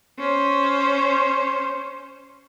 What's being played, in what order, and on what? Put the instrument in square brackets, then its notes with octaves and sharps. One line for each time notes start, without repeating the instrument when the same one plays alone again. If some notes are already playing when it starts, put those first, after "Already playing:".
[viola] C#4 C5